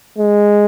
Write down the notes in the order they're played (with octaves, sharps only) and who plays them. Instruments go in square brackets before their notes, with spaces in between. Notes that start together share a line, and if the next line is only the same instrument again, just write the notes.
[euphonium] G#3